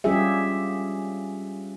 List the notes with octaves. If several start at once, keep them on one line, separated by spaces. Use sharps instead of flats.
G3 C#4 F4 G4 G#4 E5